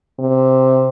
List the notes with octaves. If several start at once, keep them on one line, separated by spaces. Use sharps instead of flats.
C3